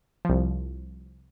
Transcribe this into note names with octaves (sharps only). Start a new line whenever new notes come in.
C2 F3